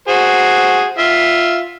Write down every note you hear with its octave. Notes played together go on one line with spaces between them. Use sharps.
F#4 G#4 C5
F4 E5